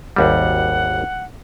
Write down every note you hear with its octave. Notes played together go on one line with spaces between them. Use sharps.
G#1 D#2 G3 F#5